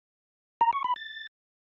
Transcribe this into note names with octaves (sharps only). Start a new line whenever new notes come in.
A#5
C#6
B5
A6